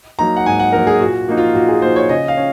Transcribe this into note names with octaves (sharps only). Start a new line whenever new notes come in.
F#3 A#3 D#4 A#5
F#5
G#2 G#5
F#5
F#3 A#3 D#4 A#4
G#4
A#2 F#4
F3 A#3 D#4
F4
A#2 F#4
G#4
F3 A#3 D#4 C5
C#5
C#3 D#5
F5
C#4